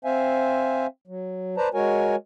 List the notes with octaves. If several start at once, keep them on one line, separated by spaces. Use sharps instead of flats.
C4 C5 E5 F5 G#5
F#3
B4 C5 D5 A5 A#5
G#3 F#4 A#4 C#5 G#5